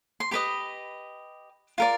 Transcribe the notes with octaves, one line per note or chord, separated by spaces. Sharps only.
C6
G4 B4 D#5 B5
F4 A#4 D5